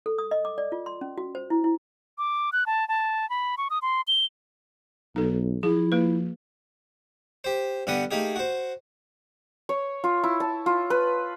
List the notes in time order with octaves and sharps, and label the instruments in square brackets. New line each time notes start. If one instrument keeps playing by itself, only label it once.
[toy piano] A4
D#6
D#5
D6
D5
F4
C6
C#4
F#4
C5
E4
E4
[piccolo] D6
F#6
A5
A5
B5
C#6
D#6
C6
G7
[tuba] B1 [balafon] D#4 A4
[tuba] F3 [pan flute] E4 [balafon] G#4
[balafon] A#3 B4
[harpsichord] G4 C5
G2 D3 B3 G4 F#5 D#6
A3 A#3 D#4 G4 G#4
F#4 C5
[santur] C#5
F4
E4
A5
F4
B4